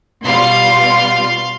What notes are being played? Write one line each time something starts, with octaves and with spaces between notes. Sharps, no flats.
B2 G3 F4 F5 C6